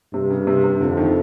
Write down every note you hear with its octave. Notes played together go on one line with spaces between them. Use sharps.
G2 C3
C#3
C3
C3
F2 D3
D#3